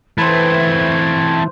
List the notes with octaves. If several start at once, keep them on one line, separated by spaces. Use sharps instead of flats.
E3 A3 C4 B4 C5 G#6